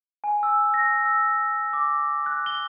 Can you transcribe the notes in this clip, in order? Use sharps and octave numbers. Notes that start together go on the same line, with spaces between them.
G#5
E6
A#6
E6
D6
F#6
G7